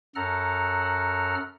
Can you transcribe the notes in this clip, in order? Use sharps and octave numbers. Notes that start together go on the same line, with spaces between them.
F#2 A4 F#5 A#5 F6